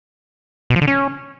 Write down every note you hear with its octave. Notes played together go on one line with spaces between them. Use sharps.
B2
F3
D3
C#4